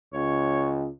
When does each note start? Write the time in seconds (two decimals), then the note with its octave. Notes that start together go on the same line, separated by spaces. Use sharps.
0.13 C#2 C#5